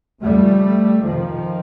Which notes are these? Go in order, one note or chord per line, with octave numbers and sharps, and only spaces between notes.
F2 C#3 G3 A3
F2 C3 D#3 F3